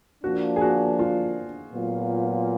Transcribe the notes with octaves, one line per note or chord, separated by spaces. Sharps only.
F3 A#3 D4 F#4
G#4
F#4
F4
A#2 F#3 B3 F4